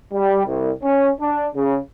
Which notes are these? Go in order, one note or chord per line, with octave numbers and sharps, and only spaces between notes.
G3
C2
C#4
D4
C#3